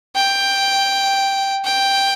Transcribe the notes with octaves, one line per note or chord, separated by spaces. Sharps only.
G5
G5